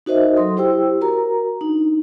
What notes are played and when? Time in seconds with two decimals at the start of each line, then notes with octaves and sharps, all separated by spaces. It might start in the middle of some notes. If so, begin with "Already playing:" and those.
0.06 D#4 F#4 A#4 C5 D#5 E5
0.36 F#3 A4 C6 D#6
0.57 E4 G4 C5 G5 E6
1.01 F#4 A#4 A#5
1.61 D4 D#4